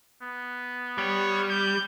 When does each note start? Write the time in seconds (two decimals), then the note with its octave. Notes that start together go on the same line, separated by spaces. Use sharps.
0.22 B3
0.98 G3 C#5
1.49 G6